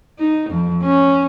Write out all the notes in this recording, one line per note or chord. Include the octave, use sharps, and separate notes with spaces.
D#4
F2
C#4